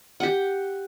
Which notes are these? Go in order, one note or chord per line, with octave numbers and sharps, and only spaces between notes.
G4 F#5